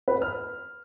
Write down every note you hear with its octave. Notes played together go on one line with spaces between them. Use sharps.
B4
F6